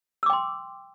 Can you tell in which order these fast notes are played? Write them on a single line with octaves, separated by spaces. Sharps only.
E6 D6 G5 C6